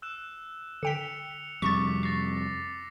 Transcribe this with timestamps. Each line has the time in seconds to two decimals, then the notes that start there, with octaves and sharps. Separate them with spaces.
0.02 E6 F#6 E7
0.83 D3 G5 B6 C#7 F7 G7
1.62 F2 C3 G3 C#6 D6 A6 B6
2.03 C#6 A6 A#6 C7